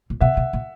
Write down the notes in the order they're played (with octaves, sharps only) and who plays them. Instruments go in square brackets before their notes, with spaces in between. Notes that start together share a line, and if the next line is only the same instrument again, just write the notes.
[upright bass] A#2
[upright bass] B2 [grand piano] E5 F#5
[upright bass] B2
A#2